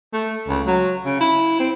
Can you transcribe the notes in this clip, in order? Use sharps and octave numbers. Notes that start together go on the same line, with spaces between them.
A3
C#2
F#3
C#3
E4
C4